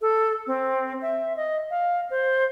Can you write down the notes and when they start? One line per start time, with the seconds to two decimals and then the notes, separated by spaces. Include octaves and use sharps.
0.01 A4
0.47 C4
1.02 E5
1.36 D#5
1.70 F5
2.10 C5